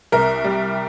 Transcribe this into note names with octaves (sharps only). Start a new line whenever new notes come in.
C2 A#4
G3